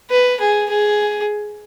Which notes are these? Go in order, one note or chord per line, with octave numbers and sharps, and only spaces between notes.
B4
G#4
G#4